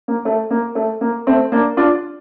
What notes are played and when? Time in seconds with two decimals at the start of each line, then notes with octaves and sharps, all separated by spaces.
0.08 A#3
0.25 A3
0.50 A#3
0.75 A3
1.01 A#3
1.27 A3 C4
1.52 A#3 D4
1.77 D4 F4